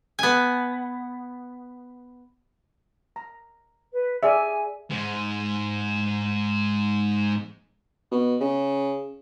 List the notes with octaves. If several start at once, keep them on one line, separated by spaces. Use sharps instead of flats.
B3 G#5
A#5
B4
G#4 D5 E5 G#5
G#2 G#3
B2
C#3